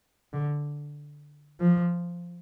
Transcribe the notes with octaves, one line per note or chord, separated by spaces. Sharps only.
D3
F3